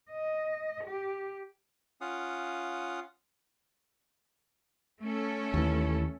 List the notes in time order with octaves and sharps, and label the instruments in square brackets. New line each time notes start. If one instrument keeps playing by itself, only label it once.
[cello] D#5
G4
[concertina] C#4 F4 F5 F#5 D#6
[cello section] A3 C#4 A4
[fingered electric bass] D#2 E3